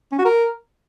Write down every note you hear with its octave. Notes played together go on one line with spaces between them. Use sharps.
C#4
F#4
A#4